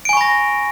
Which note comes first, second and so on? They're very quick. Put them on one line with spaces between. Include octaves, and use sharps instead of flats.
D7 G#5 C#6 B5 A#6